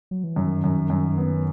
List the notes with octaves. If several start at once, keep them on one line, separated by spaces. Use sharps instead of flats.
F#3
E3
F#2 D#3
F#2
F#2
B3